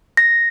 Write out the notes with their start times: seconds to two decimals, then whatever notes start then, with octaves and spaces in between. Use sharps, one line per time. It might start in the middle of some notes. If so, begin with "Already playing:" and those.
0.17 A#6